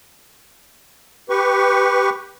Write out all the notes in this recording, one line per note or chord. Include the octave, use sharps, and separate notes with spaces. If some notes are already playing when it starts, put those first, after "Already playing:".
G4 B4 C#6